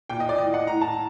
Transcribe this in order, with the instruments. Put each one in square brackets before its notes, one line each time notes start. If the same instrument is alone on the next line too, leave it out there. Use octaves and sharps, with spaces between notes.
[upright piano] A#2 G5
D#5
D5
A2 D#5
F#5
A2 A#5
A5